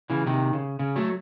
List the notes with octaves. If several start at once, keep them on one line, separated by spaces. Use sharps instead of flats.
C#3 E3
C3 D#3
C#3
C#3
F#3 A3